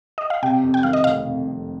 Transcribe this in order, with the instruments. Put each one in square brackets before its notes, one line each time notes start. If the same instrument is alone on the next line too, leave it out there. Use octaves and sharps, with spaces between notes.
[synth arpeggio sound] D#5
F5
[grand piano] C3 [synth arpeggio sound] G5
[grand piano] F2
[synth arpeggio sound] G5
[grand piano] D#3 [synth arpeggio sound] F5
[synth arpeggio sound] D#5
[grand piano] F1 [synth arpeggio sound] F5
[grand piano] C3
F2